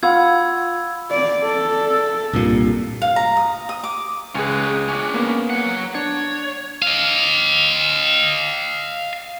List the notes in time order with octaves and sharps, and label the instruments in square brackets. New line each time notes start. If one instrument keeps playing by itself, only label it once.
[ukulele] F4 F5 F#5 [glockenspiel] B5 E6 G#6
[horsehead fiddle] D5
A4
[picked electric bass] C2 G2 A#2
[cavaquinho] F5
A#5
D#6
D#6
D6
[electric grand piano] C#2 G#4 [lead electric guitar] C#4 B4
[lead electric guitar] C#4 D4
[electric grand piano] A#3 B3
[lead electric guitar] F#3 F#5
[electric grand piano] D4 [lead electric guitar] C#5
[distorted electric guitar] D#5 F5